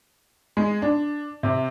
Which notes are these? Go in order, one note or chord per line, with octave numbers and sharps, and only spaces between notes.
G#3
D4
C3